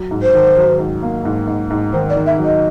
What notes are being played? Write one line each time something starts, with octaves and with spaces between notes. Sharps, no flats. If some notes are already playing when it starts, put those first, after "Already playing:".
Already playing: F#3
G#2
C5
D#3
F#3
G#2
A#3
G#2
G#2
G#2
D#3 C5
D5
D#3
E5
F#3
D#5